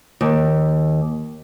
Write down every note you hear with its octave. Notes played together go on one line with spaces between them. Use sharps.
D#2